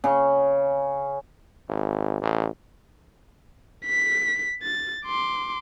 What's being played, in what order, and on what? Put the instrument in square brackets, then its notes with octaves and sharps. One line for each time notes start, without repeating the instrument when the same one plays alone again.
[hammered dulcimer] C#3
[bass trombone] G#1
A1
[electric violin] B6
A6
C6 D6